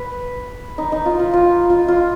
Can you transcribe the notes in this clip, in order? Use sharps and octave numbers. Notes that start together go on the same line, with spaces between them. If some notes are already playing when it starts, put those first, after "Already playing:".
Already playing: B4
D#4
D#4
F4
F4
F4
F4
F4